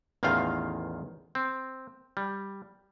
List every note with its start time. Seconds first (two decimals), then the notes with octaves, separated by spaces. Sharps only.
0.23 A1 E2 D#3 F4 F5
1.35 C4
2.17 G3